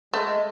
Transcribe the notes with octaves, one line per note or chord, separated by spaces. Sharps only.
G#3 A3